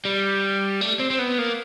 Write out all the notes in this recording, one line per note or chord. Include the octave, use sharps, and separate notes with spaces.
G3
A3
C4
C4
B3
A#3